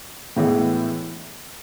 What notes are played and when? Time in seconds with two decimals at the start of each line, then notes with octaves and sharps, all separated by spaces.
0.36 A2 E3 G#3 B3